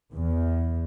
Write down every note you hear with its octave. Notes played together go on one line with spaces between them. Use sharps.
E2